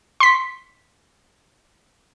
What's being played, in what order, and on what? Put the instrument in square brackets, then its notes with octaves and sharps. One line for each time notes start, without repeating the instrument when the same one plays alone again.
[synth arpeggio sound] C6 B6